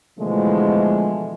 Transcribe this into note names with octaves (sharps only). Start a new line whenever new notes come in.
B2 D3 E3 F3 G#3 A3